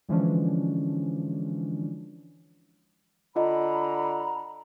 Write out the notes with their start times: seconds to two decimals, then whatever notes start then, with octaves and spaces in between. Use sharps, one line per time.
0.09 D3 E3 F3 G#3 C#4 D4
3.36 D3 F4 D#5 A#5 B5